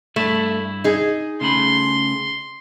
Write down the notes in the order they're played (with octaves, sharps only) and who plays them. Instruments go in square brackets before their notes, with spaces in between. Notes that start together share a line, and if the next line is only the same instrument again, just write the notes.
[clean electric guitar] G2 E4 E5 [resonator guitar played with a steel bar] A3
[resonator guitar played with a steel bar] D#4 G#4
[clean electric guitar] C#3 A3 B5 [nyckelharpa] C6